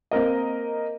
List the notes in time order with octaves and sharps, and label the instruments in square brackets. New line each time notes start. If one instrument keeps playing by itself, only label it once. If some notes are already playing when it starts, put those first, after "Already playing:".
[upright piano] A#3 C4 A#4 D#5